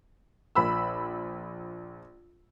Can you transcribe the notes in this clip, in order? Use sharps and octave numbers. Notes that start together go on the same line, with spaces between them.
A#1 B5 E6